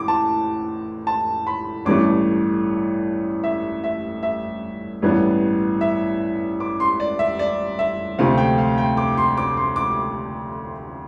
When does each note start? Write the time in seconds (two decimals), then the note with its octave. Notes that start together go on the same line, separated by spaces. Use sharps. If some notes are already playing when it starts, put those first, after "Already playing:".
Already playing: A2 E3 D6
0.08 A5
1.07 A5
1.47 B5
1.85 A1 G2 E3 A3 D6
3.44 E5
3.84 E5
4.23 E5
5.02 A1 G2 E3 B3
5.81 E5
6.60 D6
6.80 C6
7.00 D5
7.19 E5
7.39 D5
7.79 E5
8.18 D2 C3 F3 A3 C4 F5
8.38 G5
8.58 F5
8.78 G5
8.97 D6
9.18 C6
9.37 D6
9.57 C6
9.76 D6